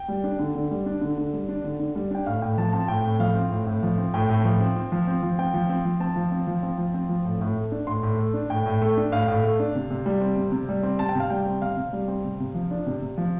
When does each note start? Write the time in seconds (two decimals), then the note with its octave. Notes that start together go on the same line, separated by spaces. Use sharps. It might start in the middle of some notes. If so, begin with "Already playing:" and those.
Already playing: G5
0.08 G3
0.24 D4
0.39 D3
0.55 D3
0.71 G3
0.86 D4
1.01 D3
1.18 D3
1.33 G3
1.49 D4
1.64 D3
1.80 D3
1.95 G3
2.11 D4 G5
2.26 A2 F5
2.42 A2 G5
2.57 F3 A5
2.73 C4 A5
2.88 A2 G5
3.04 A2
3.20 F3 F5
3.35 C4
3.51 A2
3.67 A2
3.83 F3
3.98 C4
4.14 A2 G5
4.29 A2
4.44 F3
4.60 C4
4.76 C4
4.92 F3
5.08 C4
5.23 F3
5.38 C4 G5
5.54 F3
5.69 C4
5.85 F3
6.00 C4 A5
6.16 F3
6.32 C4
6.47 F3
6.63 C4
6.78 F3
6.94 C4
7.09 F3
7.25 A2
7.41 A2
7.57 A3
7.72 D4
7.87 A2 C6
8.03 A2
8.18 A3
8.34 D4
8.50 A2 G5
8.66 A2
8.82 A3
8.97 D4
9.12 A2 F5
9.28 A2
9.43 A3
9.60 D4
9.75 C3
9.91 C3
10.06 G3
10.21 C4
10.37 C3
10.52 C3
10.69 G3
10.83 C4
10.99 C3 A5
11.09 G5
11.15 C3 F5
11.30 G3 G5
11.46 C4
11.62 C3 F5
11.77 C3
11.93 G3
12.08 C4
12.24 C3
12.40 C3
12.55 F3
12.71 D4
12.87 C3
13.02 C3
13.18 F3